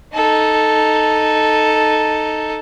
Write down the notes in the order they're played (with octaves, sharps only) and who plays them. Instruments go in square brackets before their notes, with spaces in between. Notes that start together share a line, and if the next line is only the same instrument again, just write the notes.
[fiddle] D#4 A4